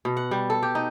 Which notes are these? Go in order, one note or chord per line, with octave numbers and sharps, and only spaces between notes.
B2
F#5
G3
A4
G4
D#4